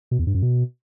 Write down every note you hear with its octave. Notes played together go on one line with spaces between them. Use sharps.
B2
E2
G2
F#2
B2